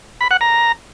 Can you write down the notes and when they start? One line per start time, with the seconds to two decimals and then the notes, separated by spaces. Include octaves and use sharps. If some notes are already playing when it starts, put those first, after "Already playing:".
0.21 B5
0.31 F#5
0.41 A#5